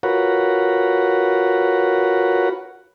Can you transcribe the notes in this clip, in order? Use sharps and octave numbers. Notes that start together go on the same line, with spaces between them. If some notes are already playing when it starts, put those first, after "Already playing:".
F4 F#4 A#4 B4 C#5 F#5